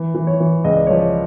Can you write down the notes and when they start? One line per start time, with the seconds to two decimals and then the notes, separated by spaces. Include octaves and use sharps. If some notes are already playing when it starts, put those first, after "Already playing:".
Already playing: E3
0.15 E3
0.27 C#5
0.40 E3
0.64 C#2 D#5
0.76 D5
0.87 F3 C#5
0.98 D5